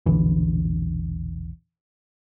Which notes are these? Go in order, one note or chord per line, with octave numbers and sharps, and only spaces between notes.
E1 A#1 D3 E3